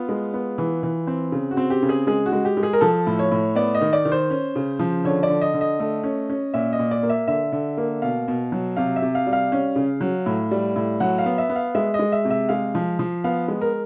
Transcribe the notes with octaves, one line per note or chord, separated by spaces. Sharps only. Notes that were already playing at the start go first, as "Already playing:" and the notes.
Already playing: B3 F4
G#3
B3
E3
E3
C4
C#3
F#4
C4
G4
C#3
G#4
G#3 G#4
F#4
G#3
G4
G#3
G#4
A#4
F3 A4
A2
C#5
A2
B3 D5
D#5
D#3
D5
D#3
C5
C#4
C#3
F3
D3 C#5
D5
D3
D#5
D3
D#5
A3
C#4
C#4
A#2 E5
D#5
A#2
D5
A#3
E5
D3 E5
D3
A#3
B2 F5
B2
F#3
C3 F5
E5
C3
F5
G3
F5
C#4
C#3
F#3
A2
G3
A2
F#3 F#5
F5
B3
E5
B3
F5
G#3 E5
D#5
G#3
E5
C3
E5
G#3 F5
F3
F3
B3 F5
G#3
A#4